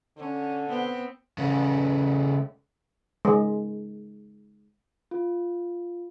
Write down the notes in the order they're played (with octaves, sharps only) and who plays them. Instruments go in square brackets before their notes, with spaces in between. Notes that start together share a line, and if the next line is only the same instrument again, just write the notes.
[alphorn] D3 [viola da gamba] C#4
[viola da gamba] B3 C4
[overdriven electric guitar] C#3 A3
[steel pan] G#3
[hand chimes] F4